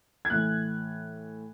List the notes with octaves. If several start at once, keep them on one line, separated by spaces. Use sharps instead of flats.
G#6
A2 E3 F#6